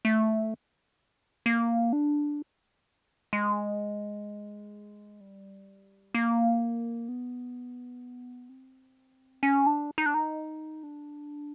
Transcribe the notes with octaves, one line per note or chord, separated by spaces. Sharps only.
A3
A#3
D4
G#3
G3
A#3
B3
C4
C#4
D4
D#4
D4
D#4
D4